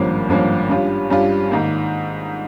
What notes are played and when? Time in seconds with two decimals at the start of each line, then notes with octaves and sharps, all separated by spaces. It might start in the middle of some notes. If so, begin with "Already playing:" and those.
Already playing: G#1 G2 F3 A#3 C#4
0.29 G#1 G2 F3 A#3 C#4
0.70 G2 G3 C#4 F4
1.10 G2 G3 C#4 F4
1.50 G#2 D#3 A#3